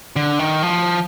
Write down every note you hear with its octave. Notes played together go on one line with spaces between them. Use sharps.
D3
D#3
F3